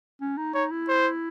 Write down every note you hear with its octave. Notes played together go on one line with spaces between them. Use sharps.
C#4
D#4
D#4 C#5
E4
C5